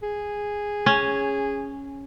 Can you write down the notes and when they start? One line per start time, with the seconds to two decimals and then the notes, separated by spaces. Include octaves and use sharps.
0.03 G#4
0.86 C#4